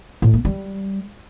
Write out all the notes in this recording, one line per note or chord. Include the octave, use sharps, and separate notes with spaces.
A2
A#3
G3